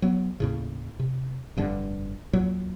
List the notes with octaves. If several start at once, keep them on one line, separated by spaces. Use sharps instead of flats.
F#3 B3
D#2 A2 C#3
C3
F1 G2 D3 D4
D#2 A#2 F#3